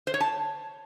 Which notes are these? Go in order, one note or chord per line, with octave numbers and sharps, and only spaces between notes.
C5
C#5
A5